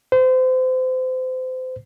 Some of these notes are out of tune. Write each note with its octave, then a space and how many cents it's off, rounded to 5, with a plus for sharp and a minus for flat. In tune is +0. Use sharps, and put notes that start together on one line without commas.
C5 -30